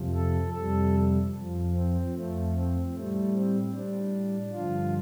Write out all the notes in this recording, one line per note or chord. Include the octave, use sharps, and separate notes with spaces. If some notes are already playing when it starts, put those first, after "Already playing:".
Already playing: F2 C3 F3
A4
F2 C3 G3 A4
F2 F3
C4
F2 F3 A3
C4
A2 G3 A3
C4
A2 G3 D4
G2 D3 F3 F4